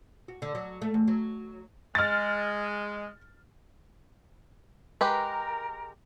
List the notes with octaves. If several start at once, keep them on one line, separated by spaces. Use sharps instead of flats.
F#4
D3
F#3
A3
E2
F#3
G#3 F6 A6
G#3 G4 A#4 B4